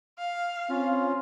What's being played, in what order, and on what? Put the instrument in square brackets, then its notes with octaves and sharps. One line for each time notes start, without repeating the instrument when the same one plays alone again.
[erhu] F5
[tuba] C4 [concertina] C#4 F4